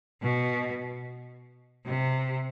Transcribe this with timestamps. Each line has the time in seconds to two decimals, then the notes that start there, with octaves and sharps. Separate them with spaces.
0.22 B2
1.86 C3